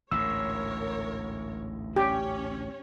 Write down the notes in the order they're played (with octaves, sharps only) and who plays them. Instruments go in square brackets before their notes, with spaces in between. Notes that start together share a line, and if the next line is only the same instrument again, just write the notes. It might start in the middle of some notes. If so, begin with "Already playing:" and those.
[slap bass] A1 D2 G#2 [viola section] A#4 C#5 [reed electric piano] E6
[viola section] C#4 C#5 [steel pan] G4